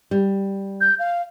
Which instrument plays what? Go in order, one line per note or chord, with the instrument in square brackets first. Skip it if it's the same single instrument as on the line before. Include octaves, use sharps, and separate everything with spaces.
[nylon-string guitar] G3
[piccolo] G6
F5